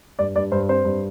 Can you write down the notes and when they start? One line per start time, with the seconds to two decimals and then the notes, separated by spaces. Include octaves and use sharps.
0.19 G2 D5
0.35 G2 D5
0.52 G2 C5
0.69 C4 C5
0.85 G2